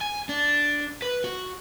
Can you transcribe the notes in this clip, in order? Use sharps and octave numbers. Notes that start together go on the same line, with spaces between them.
G#5
D4
B4
F#4